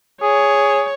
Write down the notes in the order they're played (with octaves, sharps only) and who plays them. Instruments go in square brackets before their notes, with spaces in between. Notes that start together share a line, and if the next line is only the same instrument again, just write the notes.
[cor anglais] G#4 [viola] C#5